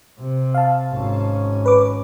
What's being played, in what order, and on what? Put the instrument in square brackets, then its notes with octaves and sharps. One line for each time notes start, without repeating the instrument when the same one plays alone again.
[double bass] C3
[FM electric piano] F5 A5
[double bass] G#1 C#4
[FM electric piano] B4 D6